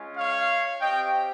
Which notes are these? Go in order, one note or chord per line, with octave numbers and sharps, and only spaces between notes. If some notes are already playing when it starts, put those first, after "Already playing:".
Already playing: G#3 C#4 F4
C#5 F5
C4 G4 D#5 G5